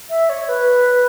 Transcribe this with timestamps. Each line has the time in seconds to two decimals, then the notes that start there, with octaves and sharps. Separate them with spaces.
0.10 E5
0.29 C#5
0.49 B4